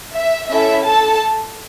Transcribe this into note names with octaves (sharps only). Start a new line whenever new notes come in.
E5
C#4 E4 A4 E5
A4 A5